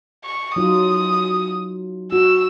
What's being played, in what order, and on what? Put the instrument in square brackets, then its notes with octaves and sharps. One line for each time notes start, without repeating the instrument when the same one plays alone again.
[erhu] C#6
[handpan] F#3 D#4 F4 [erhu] D#6
[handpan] F#4 [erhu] E6